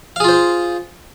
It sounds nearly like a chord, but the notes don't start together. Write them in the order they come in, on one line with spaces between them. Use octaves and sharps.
F5 G#4 F4 C5